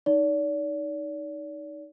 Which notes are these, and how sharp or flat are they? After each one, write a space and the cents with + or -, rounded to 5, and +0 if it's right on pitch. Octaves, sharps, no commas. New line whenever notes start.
D#4 -5 D5 -40